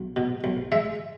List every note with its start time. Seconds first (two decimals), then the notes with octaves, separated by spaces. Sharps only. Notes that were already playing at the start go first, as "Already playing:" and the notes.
Already playing: B1
0.16 B2
0.44 B1
0.72 G#3 E5